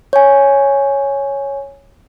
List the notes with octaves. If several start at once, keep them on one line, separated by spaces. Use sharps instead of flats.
C#5 G#5